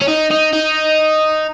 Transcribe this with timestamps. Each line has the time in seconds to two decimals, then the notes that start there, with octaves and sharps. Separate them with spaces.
0.01 C#4
0.08 D#4
0.31 D#4
0.53 D#4